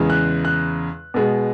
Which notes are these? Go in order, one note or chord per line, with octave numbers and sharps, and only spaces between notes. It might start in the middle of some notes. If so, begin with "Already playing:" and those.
Already playing: E2 C#3 G#3
F#6
F#6
B2 G#3 B3